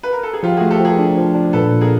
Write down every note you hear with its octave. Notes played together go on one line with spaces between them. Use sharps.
B4
A#4
A4
G#4
F3 F4 G4
A3 F#4 G#4
G4 A4
F3 G#4 A#4
D4
F3
D4
A#2 A4 B4
A#2
G#4 A#4